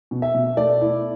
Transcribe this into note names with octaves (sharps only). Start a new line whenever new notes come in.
B2
E5
B2
A3 D5
E4